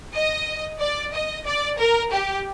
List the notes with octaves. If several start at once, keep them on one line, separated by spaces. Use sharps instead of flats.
D#5
D5
D#5
D5
A#4
G4